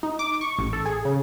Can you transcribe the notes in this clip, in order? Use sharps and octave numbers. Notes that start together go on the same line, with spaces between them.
D#4
D6
C#6
A1
A4
G#4
C#3